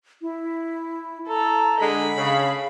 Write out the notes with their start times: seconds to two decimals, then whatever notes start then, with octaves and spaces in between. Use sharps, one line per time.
0.22 E4
1.28 A4 A#5
1.80 D3 G#3 B5
2.17 C#3 F5